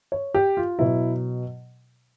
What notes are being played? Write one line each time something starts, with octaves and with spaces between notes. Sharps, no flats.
C#5
G4
F4
B2 F#3 E4